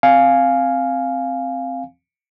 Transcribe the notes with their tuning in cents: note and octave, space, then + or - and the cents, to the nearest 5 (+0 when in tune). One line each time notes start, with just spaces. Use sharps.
C4 +0 F5 +0 G#5 +0